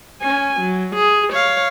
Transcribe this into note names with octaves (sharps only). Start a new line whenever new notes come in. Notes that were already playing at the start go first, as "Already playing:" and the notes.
C#4 G#5
F#3
G#4
C#5 F5